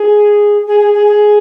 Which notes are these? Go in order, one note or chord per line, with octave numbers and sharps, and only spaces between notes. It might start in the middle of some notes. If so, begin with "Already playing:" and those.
Already playing: G#4
G#4
G#4
G#4
G#4